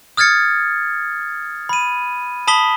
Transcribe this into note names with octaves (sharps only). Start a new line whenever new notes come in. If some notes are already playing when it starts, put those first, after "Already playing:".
D#6 F6 G#6 A6 C#7
B5 D#7
A5 B5 D#6 B6 G7